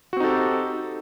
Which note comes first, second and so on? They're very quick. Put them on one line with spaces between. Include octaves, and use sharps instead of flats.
F#4 C4 D#4 A4 G4